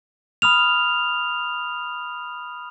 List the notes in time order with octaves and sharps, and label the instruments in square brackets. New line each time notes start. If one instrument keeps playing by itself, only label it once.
[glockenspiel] B5 D#6 F6 F7